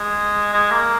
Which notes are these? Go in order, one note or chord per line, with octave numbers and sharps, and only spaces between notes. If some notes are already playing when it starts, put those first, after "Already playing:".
Already playing: G#3
G#3
A#3